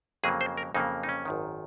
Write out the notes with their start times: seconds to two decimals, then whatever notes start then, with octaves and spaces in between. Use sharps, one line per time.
0.24 F2 C#3 F#3 A#3 G#4
0.41 C5
0.58 A#4
0.74 F2 C#3 F#3 A#3 D#4
1.03 D#4
1.09 C#4
1.25 G#1 F#2 D#3